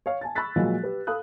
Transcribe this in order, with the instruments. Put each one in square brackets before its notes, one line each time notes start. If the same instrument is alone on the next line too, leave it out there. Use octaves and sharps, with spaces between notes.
[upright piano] C#5 F5
G#5 A5 A6
B5 C#6 E6 F#6 A6 B6
A#2 F3 F#3 G#3
G4 B4
A4 F5 B5 D#6 F#6